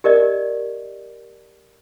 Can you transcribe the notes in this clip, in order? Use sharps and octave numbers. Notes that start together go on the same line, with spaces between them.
G4 A#4 D5 D#5